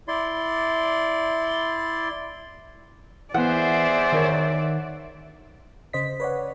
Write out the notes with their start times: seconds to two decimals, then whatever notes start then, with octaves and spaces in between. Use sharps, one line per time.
0.08 E4 D5 C6
3.34 E3 B3 G#4 C5 D5 E5 F#5
4.12 D#3 A#4 C#5
5.93 C#3 C5 D#5 B6
6.20 B4 C#5 D5 F#5